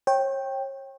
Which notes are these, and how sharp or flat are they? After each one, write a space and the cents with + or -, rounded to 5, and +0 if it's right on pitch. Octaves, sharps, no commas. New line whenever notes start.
C#5 -35 G5 +0